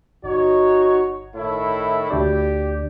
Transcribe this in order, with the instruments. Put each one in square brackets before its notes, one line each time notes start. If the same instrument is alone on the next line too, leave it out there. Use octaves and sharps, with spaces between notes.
[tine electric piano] G1 [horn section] D#4 F#4 C#5
[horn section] A2 D#3 E4
[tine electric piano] D2 D4 D5 [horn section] G4